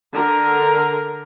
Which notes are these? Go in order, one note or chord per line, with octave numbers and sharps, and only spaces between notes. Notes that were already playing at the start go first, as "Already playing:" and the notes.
D3 A#4